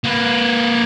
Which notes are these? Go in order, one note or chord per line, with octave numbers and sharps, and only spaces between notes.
A#3 B4